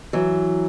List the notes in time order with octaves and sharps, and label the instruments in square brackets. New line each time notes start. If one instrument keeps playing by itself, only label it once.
[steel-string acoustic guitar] E3 F#3